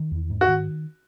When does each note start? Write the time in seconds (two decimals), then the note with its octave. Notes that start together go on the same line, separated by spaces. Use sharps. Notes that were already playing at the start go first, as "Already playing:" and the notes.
Already playing: D#3
0.11 E2
0.30 G#2
0.41 F#4
0.48 D#3